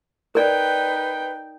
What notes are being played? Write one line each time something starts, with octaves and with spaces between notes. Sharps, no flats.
D#4 A#4 B4 D5 G5